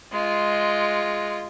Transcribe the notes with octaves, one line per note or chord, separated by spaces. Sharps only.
G#3 F4